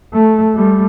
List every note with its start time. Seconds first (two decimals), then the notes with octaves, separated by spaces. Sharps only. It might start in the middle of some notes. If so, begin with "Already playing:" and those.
0.14 A3
0.55 G3 A3